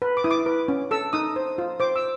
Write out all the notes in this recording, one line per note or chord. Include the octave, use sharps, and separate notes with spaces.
B4
D6
E4 D#6
D6
B4
C#4
A4 E6
D#4 D#6
C5
F4
C5 D6
E6